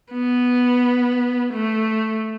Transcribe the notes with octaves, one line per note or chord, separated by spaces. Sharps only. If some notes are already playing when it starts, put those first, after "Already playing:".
B3
A3